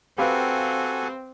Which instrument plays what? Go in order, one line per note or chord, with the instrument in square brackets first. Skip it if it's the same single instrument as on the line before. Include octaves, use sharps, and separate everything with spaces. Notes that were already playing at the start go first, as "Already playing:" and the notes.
[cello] C4 [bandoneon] F#4 A4 G#5 [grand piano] G4 B4 F5